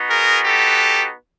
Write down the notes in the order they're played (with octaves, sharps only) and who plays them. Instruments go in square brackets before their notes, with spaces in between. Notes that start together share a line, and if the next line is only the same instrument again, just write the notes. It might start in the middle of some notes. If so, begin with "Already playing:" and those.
Already playing: [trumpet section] B3 D#4 F#4
G#4 A#4
G4 A4